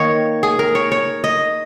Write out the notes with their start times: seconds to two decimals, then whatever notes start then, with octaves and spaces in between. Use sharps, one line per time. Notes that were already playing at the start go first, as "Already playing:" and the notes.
Already playing: D#3 A#3 C#5 D#5
0.43 G#4
0.59 A#4
0.75 C#5
0.92 C#5
1.24 D#5